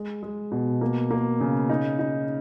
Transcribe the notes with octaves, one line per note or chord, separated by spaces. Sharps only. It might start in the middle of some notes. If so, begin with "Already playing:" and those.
Already playing: G#3
G#3
B2
A#3
A#3
C#3
D#4
D#4